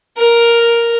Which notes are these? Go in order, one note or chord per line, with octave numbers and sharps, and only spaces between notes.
A#4